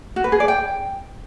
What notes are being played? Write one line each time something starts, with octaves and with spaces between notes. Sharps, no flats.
F#4
B4
G#4
D5
G5